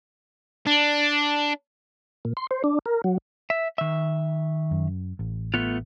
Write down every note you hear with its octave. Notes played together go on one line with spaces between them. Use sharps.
D4
A#2
C6
C5
D4
A#4
F#3
E5
D#3 E5
F#2
A1
A3 B3 F4